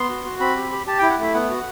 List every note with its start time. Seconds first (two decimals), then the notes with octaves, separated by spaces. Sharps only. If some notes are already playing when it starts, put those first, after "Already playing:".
Already playing: B3 C6
0.09 F#4
0.25 F#4
0.39 C4 B5
0.55 G4
0.72 G4
0.86 G4 A5
0.98 E4 G5
1.10 F#5
1.18 A3 E5
1.34 B3 F#5
1.50 F#4